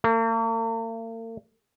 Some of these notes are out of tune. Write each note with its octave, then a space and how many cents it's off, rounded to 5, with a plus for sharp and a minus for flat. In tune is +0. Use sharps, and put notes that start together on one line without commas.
A#3 -45